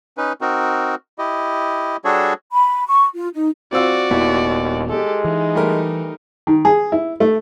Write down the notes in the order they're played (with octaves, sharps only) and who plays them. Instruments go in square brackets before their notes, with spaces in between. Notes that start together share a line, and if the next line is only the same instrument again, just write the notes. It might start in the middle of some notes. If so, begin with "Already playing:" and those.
[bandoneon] C#4 D#4 B4
C4 D#4 F#4 A#4
E4 G4 D#5
G3 D4 F#4 G#4 A4 C#5
[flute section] B5
C#6
F4
D#4
[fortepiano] C4 F4 E6 [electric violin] F#4 D5
[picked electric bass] D#1 A#2 B3 [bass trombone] D#2 [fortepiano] E4
[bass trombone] G#3 [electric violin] G4 A4
[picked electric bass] E3 [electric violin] D#4
[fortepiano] G3 A3 A#4
D#3
G#4
E4
A3